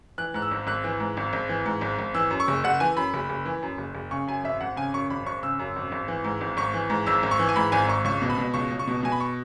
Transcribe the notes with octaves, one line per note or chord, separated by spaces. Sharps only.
E3 F#6
G#2 F#6
E6
G#1
G#1 F#6
E3
G#2
G#1
G#1
E3
G#2
G#1
G#1
E3 E6
F#2
C#6
F#1
F#1 F#5
E3 G#5
F#2 B5
F#1
F#1
E3
F#2
F#1
F#1
C#3 C#6
F#2 G#5
G#1 E5
G#1 F#5
C#3 G#5
F#2 C#6
G#1 B5
G#1 C#6
C#3 E6
F#2
G#1
G#1
E3
G#2
G#1
G#1 C#6
E3
G#2
G#1 E6
G#1
C#6
E3
G#5
G#2 B5
G#1 G#5
G#1 C#6
C#2 C#6
B2
B5
B2
C#2 C#6
C#2
C#6
B2
B2 G#5
B5
C#6